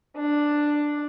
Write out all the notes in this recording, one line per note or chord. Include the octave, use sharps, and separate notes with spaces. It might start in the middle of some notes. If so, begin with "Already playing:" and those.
D4